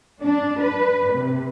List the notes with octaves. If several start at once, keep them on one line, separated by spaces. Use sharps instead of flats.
D4
B4
C3